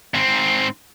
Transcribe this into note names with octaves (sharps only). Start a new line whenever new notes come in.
G#2 C4